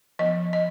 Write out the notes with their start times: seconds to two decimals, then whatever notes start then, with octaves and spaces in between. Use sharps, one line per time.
0.19 F3 B3 D#5
0.53 D#5